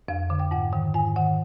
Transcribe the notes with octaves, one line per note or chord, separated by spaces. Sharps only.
F2 F5
D3
G5
G#2 F#5
D#3 G5
G#2 G#5
D#3 F#5